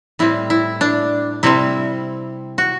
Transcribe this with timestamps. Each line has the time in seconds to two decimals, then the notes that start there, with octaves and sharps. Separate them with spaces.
0.19 A2 G3 C4 E4
0.50 E4
0.81 D4
1.43 C3 G3 C4 E4
2.58 F#4